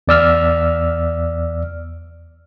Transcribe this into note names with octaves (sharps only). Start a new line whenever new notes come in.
E2 D5 E6 F6